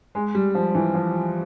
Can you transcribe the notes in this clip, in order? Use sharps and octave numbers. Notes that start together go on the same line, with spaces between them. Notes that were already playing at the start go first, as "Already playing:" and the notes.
G#3
G3
F3
E3
F3